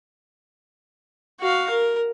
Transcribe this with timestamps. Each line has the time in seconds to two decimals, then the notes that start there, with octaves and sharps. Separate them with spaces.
1.40 F#4 F5
1.70 A#4